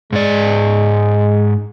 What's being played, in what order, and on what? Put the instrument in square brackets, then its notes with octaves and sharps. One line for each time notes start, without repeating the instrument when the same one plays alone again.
[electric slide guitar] G#2 D5 [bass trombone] G#3